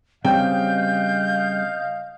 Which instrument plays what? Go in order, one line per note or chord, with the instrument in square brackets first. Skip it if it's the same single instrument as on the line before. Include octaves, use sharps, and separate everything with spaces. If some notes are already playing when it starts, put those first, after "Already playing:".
[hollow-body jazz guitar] C#3 G3 C4 [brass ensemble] D#5 F5 [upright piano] G5 [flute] G6